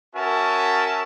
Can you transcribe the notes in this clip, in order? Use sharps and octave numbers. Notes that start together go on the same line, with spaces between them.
C#4 F#4 A#4 E5 G#5 A5